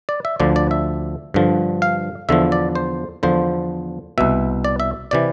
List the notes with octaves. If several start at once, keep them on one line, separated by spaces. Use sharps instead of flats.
D5
E5
D2 D3 F3 D5
D5
E5
G2 D3 F3
F5
E2 D3 F3 E5
D5
C5
E2 D3 F3 C5
C2 B2 E5
D5
E5
C3 E3 D5